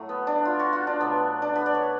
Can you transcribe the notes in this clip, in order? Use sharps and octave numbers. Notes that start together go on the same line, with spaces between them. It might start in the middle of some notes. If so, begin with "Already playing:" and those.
Already playing: A2 F#3 A3
B3
D4
F4
F#4
F4
D4
B2 F#3 A3 B3
D4
B4
D5
C#5